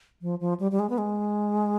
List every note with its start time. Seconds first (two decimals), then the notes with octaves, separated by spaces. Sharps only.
0.22 F3
0.40 F3
0.60 G3
0.72 G3
0.79 G#3
0.90 B3
0.98 G#3